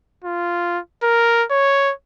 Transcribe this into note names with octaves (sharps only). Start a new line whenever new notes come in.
F4
A#4
C#5